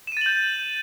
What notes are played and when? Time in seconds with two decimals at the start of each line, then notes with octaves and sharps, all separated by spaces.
0.07 E7
0.12 D#7
0.17 A6
0.21 F#7
0.26 G6